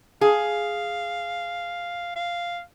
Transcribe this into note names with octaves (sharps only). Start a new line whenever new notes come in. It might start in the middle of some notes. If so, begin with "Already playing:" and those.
G#4 F5
F5